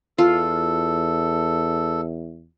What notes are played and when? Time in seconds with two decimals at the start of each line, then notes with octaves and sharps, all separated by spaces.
0.18 E2 F4 A4